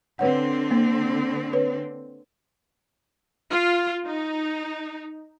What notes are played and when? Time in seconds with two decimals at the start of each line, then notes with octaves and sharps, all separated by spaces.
0.19 D3 C4 B4 C#5 F#5
0.71 A#3
1.53 B4 C#5
3.50 F4
4.07 D#4